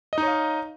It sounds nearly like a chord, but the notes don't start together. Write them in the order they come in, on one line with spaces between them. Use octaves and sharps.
D#5 D#4 C#5 F5